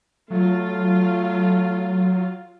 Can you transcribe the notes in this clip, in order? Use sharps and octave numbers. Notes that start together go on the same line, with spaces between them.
F#3 A3 F4